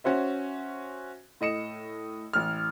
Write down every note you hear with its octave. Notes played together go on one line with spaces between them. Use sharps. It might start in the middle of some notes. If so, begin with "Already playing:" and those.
C#4 F#4 C5 E5
A2 D#5 C#7 E7
A1 F6